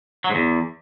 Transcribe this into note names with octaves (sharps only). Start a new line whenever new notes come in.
F#3
G#2
E2